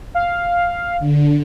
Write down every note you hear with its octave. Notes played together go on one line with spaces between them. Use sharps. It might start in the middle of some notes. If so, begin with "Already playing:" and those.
F5
D3